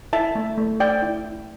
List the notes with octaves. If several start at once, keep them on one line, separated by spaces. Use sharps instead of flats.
E4 E5 A5
A3
A3
A3 D5 G5
E4
E4